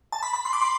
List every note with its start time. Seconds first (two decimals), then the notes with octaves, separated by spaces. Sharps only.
0.12 A5
0.23 B5
0.33 B5
0.45 C6
0.53 D6
0.61 C6